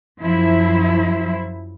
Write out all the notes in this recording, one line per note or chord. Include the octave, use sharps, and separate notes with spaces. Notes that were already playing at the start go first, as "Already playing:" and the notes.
F#2 F3 F#3 E4 C5 E5